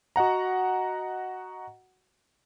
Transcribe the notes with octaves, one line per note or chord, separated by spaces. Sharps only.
F#4 D#5 F#5 A#5